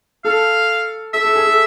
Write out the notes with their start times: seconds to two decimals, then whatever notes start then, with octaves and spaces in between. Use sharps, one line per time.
0.24 A4 F5
1.14 A4 E5
1.25 A4
1.36 G#4
1.47 A4